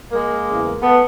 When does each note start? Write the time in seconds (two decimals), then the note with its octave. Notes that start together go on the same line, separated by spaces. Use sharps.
0.12 G#3 A#3
0.47 E2 C#3 E3
0.82 A3 B3